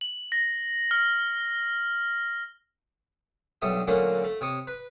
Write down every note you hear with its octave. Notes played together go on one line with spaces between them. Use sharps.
F#7
A#6
F6
B1 G2 C#5 E5 D#6
A#2 D3 F#3 A3 A#3 C#4
A3
C3 C#5 D#6
B4